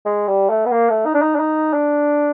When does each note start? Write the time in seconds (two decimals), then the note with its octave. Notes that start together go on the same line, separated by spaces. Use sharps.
0.06 G#3
0.28 G3
0.50 A3
0.66 B3
0.72 A#3
0.90 A3
1.06 D#4
1.14 D4
1.22 D#4
1.35 D4
1.40 D#4
1.73 D4